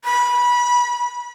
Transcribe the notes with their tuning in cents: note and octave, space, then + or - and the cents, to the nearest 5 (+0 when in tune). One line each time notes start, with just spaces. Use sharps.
B5 -20